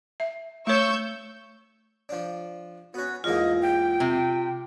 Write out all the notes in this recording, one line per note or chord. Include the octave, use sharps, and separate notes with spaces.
E5
A3 C#5 C#6 E6 G6
F3 D4
B3 C#4 F#4
E2 G#2 A#3 F4 D#5
G5
C3